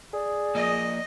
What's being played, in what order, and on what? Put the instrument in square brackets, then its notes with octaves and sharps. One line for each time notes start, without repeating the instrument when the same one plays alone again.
[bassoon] G#4 [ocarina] D5
[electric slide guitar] F3 A#3 [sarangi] D#5